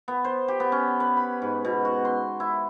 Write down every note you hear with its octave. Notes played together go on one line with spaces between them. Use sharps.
B3
C5
G4
B3
C#4
B4
B5
G#2
B2
F#4
C6
E4